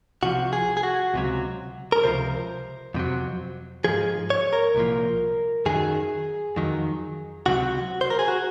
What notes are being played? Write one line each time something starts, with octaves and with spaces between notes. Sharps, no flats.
C2 C3 F3 F#4
G#4
G#4
F#4
C#2 C3 F#3
A#4
C#2 C3 F3 C5
F2 C3 F#3
G#2 F3 G#4
C#5
A#4
C2 A#2 F3
F#2 D#3 F#3 G#4
F2 D#3 F#3
C#2 C3 F#3 F#4
C5
A#4
G#4
F#4